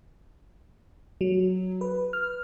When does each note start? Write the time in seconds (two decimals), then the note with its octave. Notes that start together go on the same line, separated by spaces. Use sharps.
1.21 F#3
1.81 B4
2.13 F6